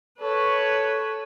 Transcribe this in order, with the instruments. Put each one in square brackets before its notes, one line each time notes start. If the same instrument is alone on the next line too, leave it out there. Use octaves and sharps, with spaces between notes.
[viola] A4 B4 [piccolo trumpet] C#5